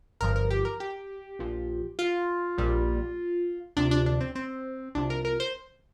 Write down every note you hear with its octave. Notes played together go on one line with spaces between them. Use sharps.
G1 G2 F3 A#4
A#4
G4
A#4
G4
A#1 A#2 F3
F4
A#1 A#2 G3
D2 C3 F3 D4
D4
D4
C4
C4
C2 C3 F3 D4
A#4
A#4
C5